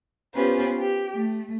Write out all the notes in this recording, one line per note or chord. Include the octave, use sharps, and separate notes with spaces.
B3 C#4 F4 G4 B4 C5
G4
A3